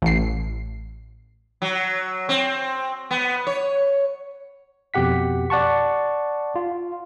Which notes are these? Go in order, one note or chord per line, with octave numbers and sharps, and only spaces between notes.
A1 C7
F#3
C4
B3
C#5
F2 B2 G4 F#5 B6
D5 F#5 A5 C#6
F4